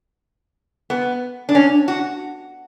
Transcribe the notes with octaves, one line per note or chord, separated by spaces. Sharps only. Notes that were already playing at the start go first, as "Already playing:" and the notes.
B3
D4
C#4
F#4